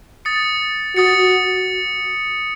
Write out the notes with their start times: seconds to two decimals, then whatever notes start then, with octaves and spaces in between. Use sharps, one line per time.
0.25 D#6 A6 C#7
0.96 F#4 D#6 A6 C#7